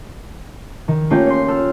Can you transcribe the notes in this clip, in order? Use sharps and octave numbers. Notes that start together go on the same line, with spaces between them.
D#3
A3 A#3 C#4 D#4 F4 G4
C#5 C6
A4 E6 F6